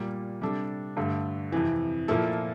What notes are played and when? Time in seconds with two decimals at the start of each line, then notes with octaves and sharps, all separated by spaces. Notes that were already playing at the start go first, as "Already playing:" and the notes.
Already playing: A#2 G3 A#3
0.41 C3 G3 D4 A4
0.97 G2 D3 A3
1.52 F2 C3 E3
2.08 A#2 F3 A#3 E4 A4